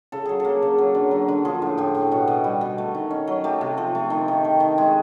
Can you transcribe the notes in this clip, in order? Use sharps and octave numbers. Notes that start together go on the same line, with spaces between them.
C#3 A4
F#3 G#4
A#3 A4
C#3
F#3
D3
F#3
D3
F3 G#4
A2
A2 G4
A2
B2 F#4
B2
G3
B2
A3
D#3
C#4
F#3
A3 G4
C3
F3
A3
D#3
D#3
D#3
D#3
G#3 G#4